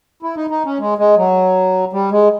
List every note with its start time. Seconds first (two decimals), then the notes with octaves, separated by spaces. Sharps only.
0.23 E4
0.37 D#4
0.50 D#4
0.65 C#4
0.79 G#3
0.98 G#3
1.17 F#3
1.93 G3
2.11 G#3